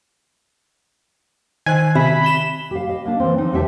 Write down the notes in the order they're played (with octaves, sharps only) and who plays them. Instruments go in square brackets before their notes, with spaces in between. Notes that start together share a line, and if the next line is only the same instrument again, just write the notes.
[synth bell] D#3 C5 F#6 [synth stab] G#5
[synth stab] C3 [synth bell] E5 [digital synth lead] B5
[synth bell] B6 E7 G7
[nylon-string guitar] G4 F5
D#5
A#3 D4
E3 C4
F3 C4 D#4
E2 G#3 G4 E5 G#5 A5